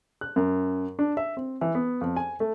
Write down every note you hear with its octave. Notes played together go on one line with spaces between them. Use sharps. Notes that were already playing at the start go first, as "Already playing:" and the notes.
F#6
F#2
D4
E5
C4
E3
B3
F2
G#5
A3